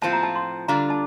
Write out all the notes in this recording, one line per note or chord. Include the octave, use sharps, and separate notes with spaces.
A2 F3 C4 F4 A5
A#5
A5
C6
D3 G3 D4 F4 A#5
A5